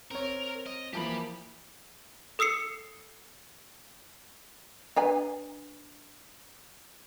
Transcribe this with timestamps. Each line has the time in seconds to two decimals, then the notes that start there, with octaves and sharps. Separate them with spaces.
0.11 C4 A#4 C#5
0.66 D#5
0.93 E3 F3 A#3 G4 B5
2.39 A4 D#6 E6 C7 C#7
4.96 D4 B4 G#5